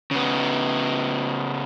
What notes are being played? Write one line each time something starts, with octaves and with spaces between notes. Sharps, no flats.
C#3 B3